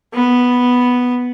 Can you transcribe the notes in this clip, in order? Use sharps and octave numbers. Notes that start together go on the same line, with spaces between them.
B3